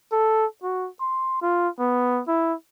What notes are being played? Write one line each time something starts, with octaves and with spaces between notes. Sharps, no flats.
A4
F#4
C6
F4
B3
E4